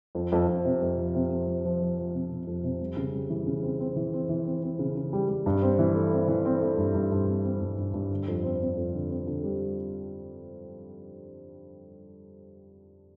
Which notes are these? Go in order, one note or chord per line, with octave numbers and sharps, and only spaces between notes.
F2
F2
F2
C3
F2
F3
C3
F2
F3
F3
F3
F3
C3
C3
F2
C3
G3
C#3
G3
E3
C#3
C4
C4
E3
C4
E3
C4
C4
C#3
C#3
G3
G3
G2
C4
E3
A3
C4
E3
C4
A3
G2
G2
G2
C4
C4
G2
G2
G2
D3
F2
C4
C4
F2
D3
C4
D3
G3